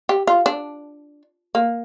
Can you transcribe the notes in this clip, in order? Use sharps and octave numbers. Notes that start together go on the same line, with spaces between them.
G4
F4
D4
A#3